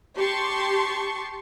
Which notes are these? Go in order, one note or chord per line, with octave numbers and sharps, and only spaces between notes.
G4 A5 C6 C#6